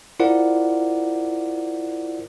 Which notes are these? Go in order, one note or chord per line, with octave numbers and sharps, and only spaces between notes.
E4 F4 A#4 C5 D5 F#5